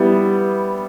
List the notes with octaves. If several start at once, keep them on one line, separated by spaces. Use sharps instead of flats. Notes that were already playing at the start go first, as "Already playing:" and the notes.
Already playing: G3 B3 E4